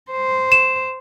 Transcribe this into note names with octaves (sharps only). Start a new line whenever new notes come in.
C5
E7